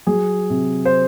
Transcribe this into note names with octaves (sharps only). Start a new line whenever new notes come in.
F#3 G#4
C3
C5